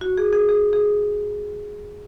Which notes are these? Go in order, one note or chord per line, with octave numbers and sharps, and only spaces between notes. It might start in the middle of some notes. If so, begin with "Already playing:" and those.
F#4
G#4
G#4
G#4
G#4